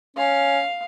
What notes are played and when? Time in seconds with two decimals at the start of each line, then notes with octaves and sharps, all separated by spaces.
0.17 C#4 F5